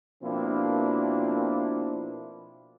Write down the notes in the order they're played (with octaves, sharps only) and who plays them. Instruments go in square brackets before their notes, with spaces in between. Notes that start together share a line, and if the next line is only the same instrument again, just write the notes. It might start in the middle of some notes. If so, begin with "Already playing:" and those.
[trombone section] B2 F3 A#3 C4 D4 E4